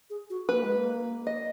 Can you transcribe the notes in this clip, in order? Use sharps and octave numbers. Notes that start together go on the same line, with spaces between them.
G#4
F#4
A#3 B4
G#3
A#3
D#5